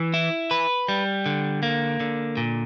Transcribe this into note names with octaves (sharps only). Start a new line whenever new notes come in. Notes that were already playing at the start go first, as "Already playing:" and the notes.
Already playing: E3
E4
B4
G3
D3
A#3
D3
A#2